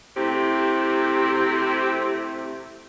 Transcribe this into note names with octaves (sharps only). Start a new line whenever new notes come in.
C3 A3 C4 E4 G4